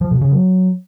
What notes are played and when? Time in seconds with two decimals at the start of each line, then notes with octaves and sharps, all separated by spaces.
0.01 F3
0.11 B2
0.21 C#3
0.31 F#3